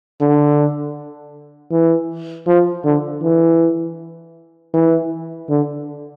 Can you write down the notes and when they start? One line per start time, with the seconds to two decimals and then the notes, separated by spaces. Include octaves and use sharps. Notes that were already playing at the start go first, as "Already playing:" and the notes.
0.21 D3
1.72 E3
2.47 F3
2.85 D3
3.23 E3
4.74 E3
5.49 D3